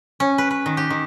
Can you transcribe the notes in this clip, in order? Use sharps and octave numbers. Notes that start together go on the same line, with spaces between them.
C#4
B4
B4
D#3
G4
D#3